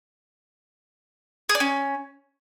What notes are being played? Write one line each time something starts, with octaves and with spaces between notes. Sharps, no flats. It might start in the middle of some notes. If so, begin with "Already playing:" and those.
G#4
D5
C#4